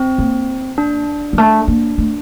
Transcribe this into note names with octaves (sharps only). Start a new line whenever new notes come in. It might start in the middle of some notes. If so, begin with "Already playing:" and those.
Already playing: C4
A#3
D4
G3
A3
A#3
A3